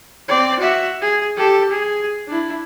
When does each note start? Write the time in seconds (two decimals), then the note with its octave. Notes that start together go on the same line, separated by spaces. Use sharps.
0.28 C4 D5
0.59 F#4 E5
1.01 G#4
1.37 G4 A4
1.70 G#4
2.28 D4 E4